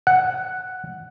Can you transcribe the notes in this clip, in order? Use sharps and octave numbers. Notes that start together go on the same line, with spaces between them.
F#5